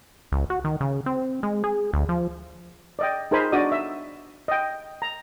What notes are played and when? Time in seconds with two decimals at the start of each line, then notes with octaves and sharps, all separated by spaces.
0.32 C#2
0.50 F#4
0.64 D#3
0.80 C#3
1.06 C4
1.43 G#3
1.64 G#4
1.93 D2
2.09 F3
2.99 D5 D#5 G5
3.31 D#4 G#4 A#4 C5 G#5 B5
3.52 D4 F#4 D5 D#5 D#6
3.72 E5
4.48 D#5 G5
5.02 A#5